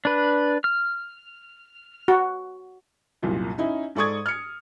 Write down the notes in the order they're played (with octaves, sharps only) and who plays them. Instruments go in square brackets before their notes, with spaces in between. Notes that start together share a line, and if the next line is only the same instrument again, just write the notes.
[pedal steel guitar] D4 B4
F6
[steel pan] F#4
[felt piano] C2 F#2 A#2
C#4 D#4 E4
G#2 A4 D5 C#6 D#6 G#6
F6 C#7